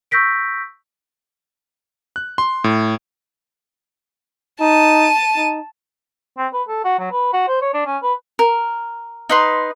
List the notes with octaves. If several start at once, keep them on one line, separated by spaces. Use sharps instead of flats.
C#6 E6 G6 A#6 B6 D7
F#6
C6
A2
D#4 A5 D#7
D#4
C4
B4
A4
F#4
F#3
B4
F#4
C5
C#5
D4
C#4
B4
A#4
D#4 B4 C6